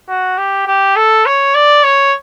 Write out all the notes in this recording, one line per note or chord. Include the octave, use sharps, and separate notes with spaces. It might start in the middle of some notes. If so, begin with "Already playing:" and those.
F#4
G4
G4
A4
C#5
D5
C#5